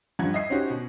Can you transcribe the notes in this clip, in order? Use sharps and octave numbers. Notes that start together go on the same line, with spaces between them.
G2 F3 F#5 G#6
D#5 E5 C7
C4 C#4 D#4 F#4 G4
B2